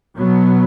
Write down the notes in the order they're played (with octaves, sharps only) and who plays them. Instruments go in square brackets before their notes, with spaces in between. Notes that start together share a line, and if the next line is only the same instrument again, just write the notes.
[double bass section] B2 F#3 B3